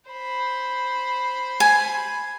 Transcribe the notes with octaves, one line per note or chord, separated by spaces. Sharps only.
C5 B5
G#5